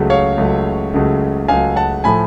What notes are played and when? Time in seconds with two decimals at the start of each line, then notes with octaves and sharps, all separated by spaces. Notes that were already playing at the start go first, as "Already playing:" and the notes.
Already playing: C#2 C#3 F#3 A3
0.10 C#5 F5
0.38 C#2 C#3 F#3 A3
0.94 C#2 C#3 F#3 A3
1.48 C#2 C#3 F#3 A3 F5 G#5
1.76 F#5 A5
2.04 A2 F3 A3 G#5 B5